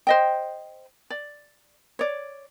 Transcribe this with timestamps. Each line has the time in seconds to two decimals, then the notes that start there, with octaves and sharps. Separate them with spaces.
0.07 C5 D#5 G5
1.10 D5
1.99 C#5 D5